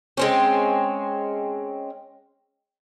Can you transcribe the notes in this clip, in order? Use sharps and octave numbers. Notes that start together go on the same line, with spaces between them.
G#3 C4 C#4